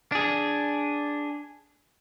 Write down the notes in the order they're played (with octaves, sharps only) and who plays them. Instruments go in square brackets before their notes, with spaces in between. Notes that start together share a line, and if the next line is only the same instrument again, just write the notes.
[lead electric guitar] D4 G#4